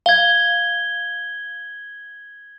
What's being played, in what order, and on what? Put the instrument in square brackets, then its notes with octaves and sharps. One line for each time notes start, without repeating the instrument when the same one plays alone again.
[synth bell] F5 [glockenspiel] G#6 G7